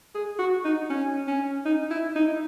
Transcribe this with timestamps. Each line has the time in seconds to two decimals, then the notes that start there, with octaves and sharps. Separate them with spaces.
0.15 G#4
0.39 F#4
0.65 D#4
0.90 C#4
1.28 C#4
1.65 D#4
1.91 E4
2.16 D#4